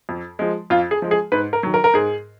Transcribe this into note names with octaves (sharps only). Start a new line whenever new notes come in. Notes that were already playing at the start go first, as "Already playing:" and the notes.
F2
F3 G#3
F2 F4
G#4
F3 G#3
G#4
G#2 B4
A#4
D#3 F#3
A#4
A#4
G#2 G#4